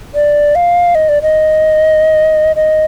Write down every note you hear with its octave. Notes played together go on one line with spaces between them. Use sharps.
D5
F5
D#5
D5
D#5
D#5